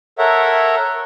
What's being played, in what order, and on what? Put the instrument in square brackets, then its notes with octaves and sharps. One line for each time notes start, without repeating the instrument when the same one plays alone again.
[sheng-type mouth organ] A4 A#4 C#5 E5 F#5